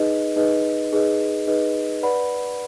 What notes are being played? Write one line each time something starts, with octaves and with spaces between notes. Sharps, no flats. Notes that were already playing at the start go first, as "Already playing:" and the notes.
Already playing: D#4 G#4 B4 D#5
D#4 G#4 B4 D#5
D#4 G#4 B4 D#5
D#4 G#4 B4 D#5
B4 D5 F#5 B5